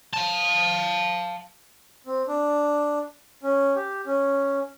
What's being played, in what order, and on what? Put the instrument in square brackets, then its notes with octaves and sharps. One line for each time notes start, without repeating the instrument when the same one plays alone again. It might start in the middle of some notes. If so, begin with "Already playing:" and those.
[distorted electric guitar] F5 A5
[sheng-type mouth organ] C4
D4
C#4
G4
C#4